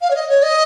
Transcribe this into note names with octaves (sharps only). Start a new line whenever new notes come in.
F5
C#5
D#5
C#5
D#5